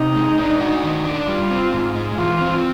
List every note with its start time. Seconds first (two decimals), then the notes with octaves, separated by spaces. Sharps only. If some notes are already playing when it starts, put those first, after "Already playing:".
Already playing: C3 D#4
0.16 G#3
0.38 D4
0.60 F#4
0.83 D#3
1.05 D4
1.28 G3 F4
1.50 C4
1.73 G#2
1.95 G#3
2.18 E3 F4
2.41 C4